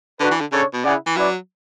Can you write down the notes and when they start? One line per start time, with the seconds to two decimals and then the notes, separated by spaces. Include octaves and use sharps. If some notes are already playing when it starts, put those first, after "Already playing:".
0.20 D3 D4 F#4 B4
0.31 E3
0.40 D3
0.52 C#3 D4 A4 C#5
0.73 B2
0.84 C#3 E4 G#4 D5 F#5
1.06 E3
1.17 F#3 C#4 E4 B4 D5